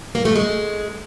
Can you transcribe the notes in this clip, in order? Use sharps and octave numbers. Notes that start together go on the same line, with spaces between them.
A#3
A3
G#3